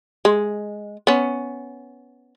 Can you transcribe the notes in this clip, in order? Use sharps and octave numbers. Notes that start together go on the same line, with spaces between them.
G#3
B3 C#4